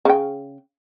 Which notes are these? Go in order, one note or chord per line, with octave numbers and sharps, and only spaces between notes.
C#3 G5